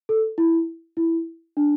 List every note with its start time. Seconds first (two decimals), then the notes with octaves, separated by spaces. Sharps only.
0.09 A4
0.38 E4
0.97 E4
1.57 D4